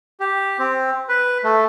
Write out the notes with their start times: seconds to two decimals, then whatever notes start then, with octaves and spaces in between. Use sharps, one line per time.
0.20 G4
0.59 C4
1.09 B4
1.44 A3